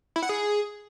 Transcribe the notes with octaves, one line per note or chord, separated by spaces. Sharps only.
E4
F#5
G#4